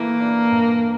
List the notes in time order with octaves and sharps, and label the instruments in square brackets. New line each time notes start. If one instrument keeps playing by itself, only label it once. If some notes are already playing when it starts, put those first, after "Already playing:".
Already playing: [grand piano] E3 A3 [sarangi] A#3
[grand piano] D4
G2